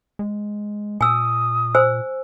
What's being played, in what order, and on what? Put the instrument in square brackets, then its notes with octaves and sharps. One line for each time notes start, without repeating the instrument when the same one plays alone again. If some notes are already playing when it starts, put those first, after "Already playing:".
[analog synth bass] G#3
[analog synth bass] A#2 [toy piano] G#5 E6 [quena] D#6
[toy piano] C5 G#5 E6